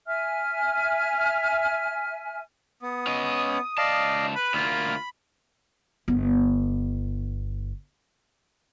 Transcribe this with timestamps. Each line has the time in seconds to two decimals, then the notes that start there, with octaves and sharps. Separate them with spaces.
0.07 E5 G#5 F6
2.82 B3 D#6
3.07 C#4 D#5
3.78 C#2 D5 D#5 F5 A5
4.35 B4 B5
4.54 D2 A#3 F4
6.08 G1 B3